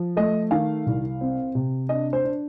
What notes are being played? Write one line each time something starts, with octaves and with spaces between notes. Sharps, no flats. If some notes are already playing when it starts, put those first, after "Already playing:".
Already playing: F3
A3 D#5
D#3 F5
C2
C4
C3
D4 D#5
C5
D4